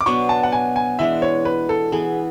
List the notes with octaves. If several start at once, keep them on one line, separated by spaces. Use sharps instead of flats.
D6
B2 F#3 B3 D4 C#6
A5
F#5
G#5
G#5
E3 G#3 D4 E5
C#5
B4
A4
E3 B3 E4 G#4